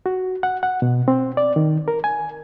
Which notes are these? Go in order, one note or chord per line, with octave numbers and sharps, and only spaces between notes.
F#4
F#5
F#5
B2
C4
D5
D#3
A#4
G#5